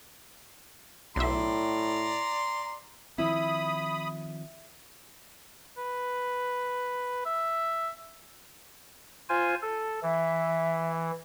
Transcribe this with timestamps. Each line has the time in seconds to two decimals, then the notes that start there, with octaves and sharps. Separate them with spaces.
1.16 B1 A2 D5 E5 A#5 C6
3.18 D#3 F3 C4 E4 B5 D#6
5.78 B4
7.25 E5
9.29 F4 C5 G#5
9.62 A4
10.03 E3 E5